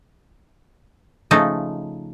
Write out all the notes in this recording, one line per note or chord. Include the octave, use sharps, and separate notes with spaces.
C#3 F3 A3 D#4